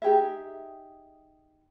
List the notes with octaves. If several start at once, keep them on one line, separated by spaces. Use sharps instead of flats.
D#4 G4 G#4 E5